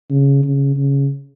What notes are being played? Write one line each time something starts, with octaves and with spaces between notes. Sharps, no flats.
C#3
C#3
C#3